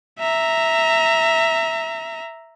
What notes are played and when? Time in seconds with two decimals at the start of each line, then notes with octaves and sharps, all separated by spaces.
0.19 E5 A#5